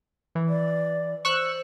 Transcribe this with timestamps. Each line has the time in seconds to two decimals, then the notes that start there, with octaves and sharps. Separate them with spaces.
0.35 E3
0.49 D5
1.25 C5 C#6 E6 F#6